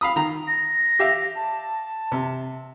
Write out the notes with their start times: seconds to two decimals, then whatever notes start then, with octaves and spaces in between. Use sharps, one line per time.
0.01 F5 B5 D#6
0.16 D#3 A#5
0.47 A#6
0.99 G4 E5 F5
1.35 A5
2.12 C3